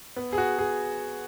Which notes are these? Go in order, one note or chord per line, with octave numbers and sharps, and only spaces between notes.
B3
G#4
F#4
G#4